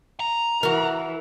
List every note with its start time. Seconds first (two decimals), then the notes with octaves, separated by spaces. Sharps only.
0.20 A#5
0.63 E3 F#4 A#4